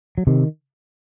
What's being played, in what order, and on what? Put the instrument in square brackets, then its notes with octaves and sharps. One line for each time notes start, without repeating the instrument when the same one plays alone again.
[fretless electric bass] F#3
C3 D#3